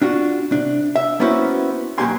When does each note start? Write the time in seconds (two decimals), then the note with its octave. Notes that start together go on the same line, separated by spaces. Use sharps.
0.02 D4 F4 F#4
0.52 C3 D4
0.96 E5
1.20 A#3 B3 C#4 E4 F#4 C5
1.98 B1 A#3 F#4 G4 G#5 C6